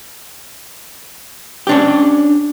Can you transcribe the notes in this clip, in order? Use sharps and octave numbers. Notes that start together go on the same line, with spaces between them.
C#4 D4 G4